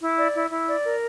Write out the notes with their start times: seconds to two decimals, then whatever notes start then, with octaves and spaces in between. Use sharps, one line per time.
0.02 E4
0.18 D5
0.35 E4
0.51 E4
0.68 D5
0.85 A#4